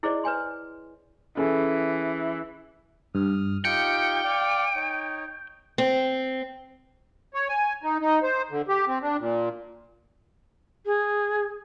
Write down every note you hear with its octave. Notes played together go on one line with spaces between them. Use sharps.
E4 G#4 C5 D5 D#5
B4 C#5 G#5 C6
E3 C#4 G#4 A4
G2 D#6 F6
D#4 F4 G4 G5 C#7
D5 F5 D6
D#4 C#5
C4
C#5
G#5
D#4
D#4
C5
D3
G4
C4
D4
A#2
G#4